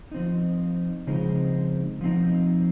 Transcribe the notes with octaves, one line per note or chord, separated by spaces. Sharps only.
F3 C4 D#4
C#3 F3 G#3 C4 D#4
F3 C4 D#4